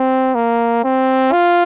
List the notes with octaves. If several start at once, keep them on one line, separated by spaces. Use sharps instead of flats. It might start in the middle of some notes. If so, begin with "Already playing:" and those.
Already playing: C4
A#3
C4
F4